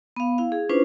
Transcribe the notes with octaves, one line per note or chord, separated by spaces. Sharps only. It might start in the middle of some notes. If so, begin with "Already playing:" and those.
B3 F5
E4 F5
G#4
C#4 D4 E4 F4 B4 C5